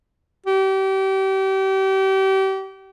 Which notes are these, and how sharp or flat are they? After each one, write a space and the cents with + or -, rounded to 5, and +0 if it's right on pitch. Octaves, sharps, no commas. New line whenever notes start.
G4 -30